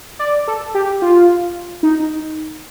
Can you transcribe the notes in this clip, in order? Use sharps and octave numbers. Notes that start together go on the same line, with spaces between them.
D5
A4
G4
F4
D#4